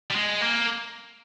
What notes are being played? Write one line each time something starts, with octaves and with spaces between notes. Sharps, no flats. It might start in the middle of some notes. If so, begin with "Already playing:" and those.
G3
G#3
A#3